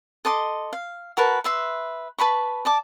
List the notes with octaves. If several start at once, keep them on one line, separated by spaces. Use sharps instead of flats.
A4 D#5 C6 D6
F5
F#4 A#4 B4 A5
B4 E5 C6
B4 A5 B5 C#6
D5 A5 D6